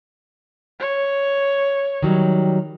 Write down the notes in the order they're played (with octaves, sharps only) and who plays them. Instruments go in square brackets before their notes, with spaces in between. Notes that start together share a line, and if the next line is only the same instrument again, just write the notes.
[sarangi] C#5
[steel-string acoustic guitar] D#3 F#3 G3